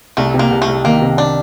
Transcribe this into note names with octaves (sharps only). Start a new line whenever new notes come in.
C2 A3
C3
A#3
C2
A3
C2
D#3 A#3
C3
D4